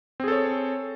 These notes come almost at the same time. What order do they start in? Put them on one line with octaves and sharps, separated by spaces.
C4 G#4 A4 C#5